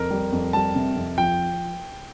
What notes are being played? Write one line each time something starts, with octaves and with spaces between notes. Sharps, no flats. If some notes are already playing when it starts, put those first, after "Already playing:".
Already playing: F2 A#4
G3
F2
G3 A5
C3
F2
F3 G5